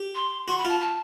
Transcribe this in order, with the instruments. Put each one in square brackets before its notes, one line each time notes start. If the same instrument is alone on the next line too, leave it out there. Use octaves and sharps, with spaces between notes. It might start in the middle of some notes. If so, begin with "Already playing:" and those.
Already playing: [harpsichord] G4
[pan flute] C6
[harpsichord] F#4 [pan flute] C6
[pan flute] B5
[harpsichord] F4 [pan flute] A5
[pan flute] A5